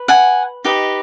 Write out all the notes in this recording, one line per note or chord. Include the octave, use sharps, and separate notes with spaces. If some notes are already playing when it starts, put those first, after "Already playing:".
Already playing: B4
F#5 G#5
D#4 G4 B4 D#5